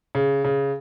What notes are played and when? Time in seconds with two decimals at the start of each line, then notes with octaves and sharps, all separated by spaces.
0.15 C#3
0.44 C#3